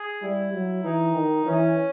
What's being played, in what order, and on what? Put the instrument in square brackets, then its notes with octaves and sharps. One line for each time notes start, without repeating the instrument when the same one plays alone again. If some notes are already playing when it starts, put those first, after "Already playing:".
Already playing: [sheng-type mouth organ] G#4
[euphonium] G3 [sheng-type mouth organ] E4
[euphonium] F#3
[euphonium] E3 [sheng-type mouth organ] D#4
[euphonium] D#3
[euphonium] E3 [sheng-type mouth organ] C#4